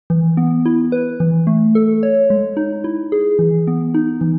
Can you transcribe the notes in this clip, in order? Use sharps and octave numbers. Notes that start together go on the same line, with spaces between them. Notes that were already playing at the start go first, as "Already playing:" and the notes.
E3
B3
E4
B4
E3
A3
A4
C#5
G#3
D#4
E4
G#4
E3
B3
D#4
E3